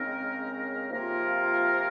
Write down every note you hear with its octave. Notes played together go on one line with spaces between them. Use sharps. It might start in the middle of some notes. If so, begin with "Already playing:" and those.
Already playing: C#3 G#3 C4 D#4 A#4
C3 F3 A#3 F4 A#4